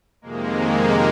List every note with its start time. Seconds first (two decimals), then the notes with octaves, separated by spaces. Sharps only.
0.22 F2 C3 D#3 G#3 A#3